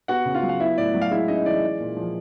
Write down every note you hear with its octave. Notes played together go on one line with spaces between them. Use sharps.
B3 F#4 F#5
C#3
F4 F5
F#3
F5
B3 E4 E5
A2 D5
F#3
F5
G#3 E4 E5
C#4 D#4 D#5
E3 D5
G#3
A#2
F3